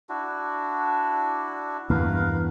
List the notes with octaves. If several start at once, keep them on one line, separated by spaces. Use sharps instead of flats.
D4 E4 F#4
E2 G2 E3 A#4 B4 F5